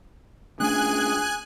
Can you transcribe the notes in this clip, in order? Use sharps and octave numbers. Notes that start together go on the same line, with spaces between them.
A3 C#4 D4 G#4 G#5 F#6